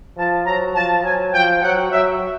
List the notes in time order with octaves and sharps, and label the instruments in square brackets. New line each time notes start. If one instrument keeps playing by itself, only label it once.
[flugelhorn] F3 [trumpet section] A5
[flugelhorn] F#3 [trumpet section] A#5
[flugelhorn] F3 [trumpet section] A5
[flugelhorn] F#3 [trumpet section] G#5
[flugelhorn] F3 [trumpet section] G5
[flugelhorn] F#3 [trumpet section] F#5
[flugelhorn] F#3 [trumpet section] E5